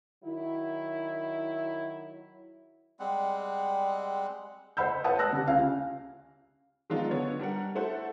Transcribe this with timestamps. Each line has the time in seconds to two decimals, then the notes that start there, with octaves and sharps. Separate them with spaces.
0.24 D#3 F#3 E4
3.00 G3 G#3 C4 F#5
4.77 C5 D#5 F#5 B5 E6 G6
5.04 B4 C#5 F#5 A5 D#6
5.19 A5 E6 F#6 A#6
5.33 D3 G4
5.47 C#2 C#3 F5 G#5
6.90 D#3 F#3 G#3 B3 D4 F4
7.11 D3 B3 C#5
7.39 G3 D4 A#4 F#5
7.75 A3 E4 A4 C5 F#5